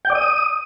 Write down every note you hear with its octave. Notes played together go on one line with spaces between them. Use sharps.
G5
D5
D#6